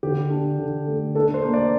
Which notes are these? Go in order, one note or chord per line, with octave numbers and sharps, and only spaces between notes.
D3 G4
D4
D3
A3
D4 A4
C5
A#3
D5